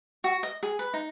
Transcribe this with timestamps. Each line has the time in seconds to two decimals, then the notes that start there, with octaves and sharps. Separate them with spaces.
0.24 F#4
0.43 D#5
0.63 G#4
0.79 B4
0.94 D#4